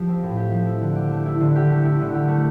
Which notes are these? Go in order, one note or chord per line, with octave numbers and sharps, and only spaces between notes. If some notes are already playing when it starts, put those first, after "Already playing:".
Already playing: F3 G4
C4
A2
G4
F3
E4
D3
G4
A3
E4
D3
G4
A3
E4
D3
G4
A3